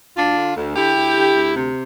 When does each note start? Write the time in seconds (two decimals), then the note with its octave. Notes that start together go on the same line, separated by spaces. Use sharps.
0.17 D2 D4 F4
0.36 D3
0.56 D2
0.76 D3 E4 G4
0.96 D2
1.16 D3
1.35 D2
1.56 C3